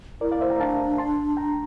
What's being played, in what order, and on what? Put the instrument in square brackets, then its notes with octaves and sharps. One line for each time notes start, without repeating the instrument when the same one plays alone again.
[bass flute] E4 [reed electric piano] A#4 D5
[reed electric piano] D5 F5
C5 E5
G5 A#5
[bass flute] D4 [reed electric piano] F5 A5
[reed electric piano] A5 C6
G5 A#5